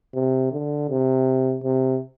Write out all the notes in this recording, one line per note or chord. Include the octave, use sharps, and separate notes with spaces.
C3
D3
C3
C3